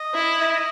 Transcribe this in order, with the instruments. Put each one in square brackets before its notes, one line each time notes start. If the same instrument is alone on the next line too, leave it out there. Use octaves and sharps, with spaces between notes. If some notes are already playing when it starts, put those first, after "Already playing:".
Already playing: [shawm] D#5
[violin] E4